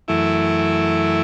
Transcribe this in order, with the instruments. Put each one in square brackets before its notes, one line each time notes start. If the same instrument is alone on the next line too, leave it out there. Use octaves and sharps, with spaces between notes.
[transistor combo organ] F#2 E3 A3 E4